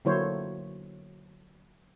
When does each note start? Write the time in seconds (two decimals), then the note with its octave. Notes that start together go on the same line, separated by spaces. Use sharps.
0.05 D3 F#3 A#3 E4 C5 C#5